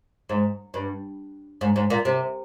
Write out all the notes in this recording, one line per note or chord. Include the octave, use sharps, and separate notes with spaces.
G#2
G2
G#2
G#2
A#2
C3